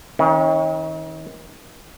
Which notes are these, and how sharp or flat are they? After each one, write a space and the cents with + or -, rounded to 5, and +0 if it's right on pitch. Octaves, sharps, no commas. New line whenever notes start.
D#3 +40 C#4 -20